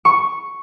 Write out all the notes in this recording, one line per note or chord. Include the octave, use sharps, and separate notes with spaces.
C#6